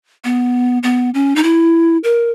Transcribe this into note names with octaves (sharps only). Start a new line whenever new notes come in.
B3
B3
C#4
D#4
E4
A#4